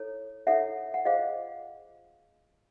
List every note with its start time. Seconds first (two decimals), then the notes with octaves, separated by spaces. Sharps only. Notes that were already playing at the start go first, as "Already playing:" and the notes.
Already playing: E4 A4 C#5
0.47 E4 A4 C#5 E5 F#5
0.94 F#5
1.05 F4 G#4 C5 D#5 F5